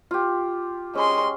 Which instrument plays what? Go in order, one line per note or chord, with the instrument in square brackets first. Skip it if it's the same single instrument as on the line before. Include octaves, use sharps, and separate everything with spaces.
[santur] F4 G4
[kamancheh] G#3 C6 [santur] C#4